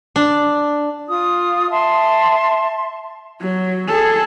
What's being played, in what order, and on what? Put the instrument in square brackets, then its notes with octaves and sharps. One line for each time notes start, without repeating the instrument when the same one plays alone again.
[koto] D4
[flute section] F4 D#6
E5 A5 C6
[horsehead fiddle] F#3
G#4 A4